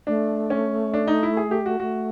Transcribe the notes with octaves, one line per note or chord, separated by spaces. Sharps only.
A3 D4
C#4
D4
D#4
E4
G#4
G4
F#4
A3 F#4